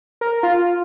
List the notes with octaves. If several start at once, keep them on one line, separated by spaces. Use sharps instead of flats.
A#4
F4